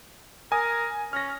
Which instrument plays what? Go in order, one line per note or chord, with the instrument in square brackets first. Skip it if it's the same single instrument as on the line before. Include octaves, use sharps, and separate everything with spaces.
[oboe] A#4 [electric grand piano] G#5 D#6
[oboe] C#4 [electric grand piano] F6 A#6